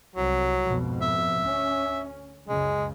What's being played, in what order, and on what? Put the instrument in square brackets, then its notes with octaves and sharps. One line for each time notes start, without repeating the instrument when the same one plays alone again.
[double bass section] C2 [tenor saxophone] F#3
[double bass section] F2 G#2 B2
[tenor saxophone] E5
[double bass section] D2 C#4
[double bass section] C#2 F#2 C#3 [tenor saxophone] G#3